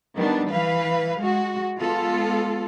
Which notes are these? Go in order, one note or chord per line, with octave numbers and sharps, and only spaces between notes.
D#3 G3 B3 D4
E3 B4 F5
G#3 F#4
G#3 B3 F4 A4